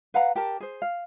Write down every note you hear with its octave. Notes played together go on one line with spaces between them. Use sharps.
B4 F5 F#5 A#5
G4 A#4 A5
G#4 C5
F5